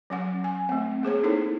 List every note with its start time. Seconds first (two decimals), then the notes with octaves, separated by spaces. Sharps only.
0.10 F#3 C#4 F#5
0.44 G#5
0.69 A3 C4
1.03 A#3 G#4 C5 C#5
1.24 D#4 E4 A4 C#5